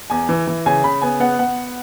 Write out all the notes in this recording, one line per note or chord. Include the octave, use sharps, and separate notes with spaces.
E2 G#5
E3
E3
C#3 G#5
C#3 B5
B3 G#5
B3 F#5
B3 F#5